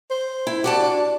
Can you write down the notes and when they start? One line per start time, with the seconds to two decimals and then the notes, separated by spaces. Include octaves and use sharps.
0.11 C5
0.47 E4
0.64 F#4 G4 D5 A5
0.81 D4